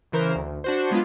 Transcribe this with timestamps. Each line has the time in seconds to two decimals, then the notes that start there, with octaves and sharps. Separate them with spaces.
0.12 C#3 E3 A#4 C5
0.35 D2
0.64 D4 F#4 C5
0.90 F#3 G#3 B3 D4 F4